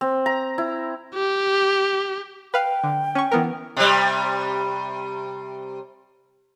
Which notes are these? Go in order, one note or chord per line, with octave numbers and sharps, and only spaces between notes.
C4
A#5
E4
G4
B4 F5 G5
D3
C#4 C#6
E3 B3 A#4
C3 G3